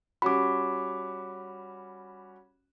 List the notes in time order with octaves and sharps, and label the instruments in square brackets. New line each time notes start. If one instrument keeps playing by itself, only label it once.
[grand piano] G3 C#4 F#4 [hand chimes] B5 D6